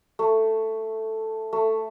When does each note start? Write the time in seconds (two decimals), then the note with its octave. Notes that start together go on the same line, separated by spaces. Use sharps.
0.19 A3
1.53 A3